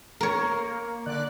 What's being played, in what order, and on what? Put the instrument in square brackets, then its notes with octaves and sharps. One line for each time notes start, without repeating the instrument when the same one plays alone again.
[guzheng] A#4 C#5
[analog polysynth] A#3
D3 D5 F#6